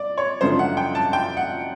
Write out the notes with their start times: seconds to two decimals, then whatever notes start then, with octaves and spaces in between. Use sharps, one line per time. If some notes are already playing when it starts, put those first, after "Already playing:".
Already playing: D5
0.18 C#5
0.41 F#2 C#3 F3 A3 D4 C5
0.59 F#5
0.77 G5
0.95 A5
1.13 G5
1.37 F#5